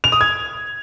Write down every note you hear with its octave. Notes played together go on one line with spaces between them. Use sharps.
F7
D#6
G#6